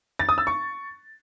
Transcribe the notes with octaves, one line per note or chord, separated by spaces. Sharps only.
A6
D#6
E6
C#6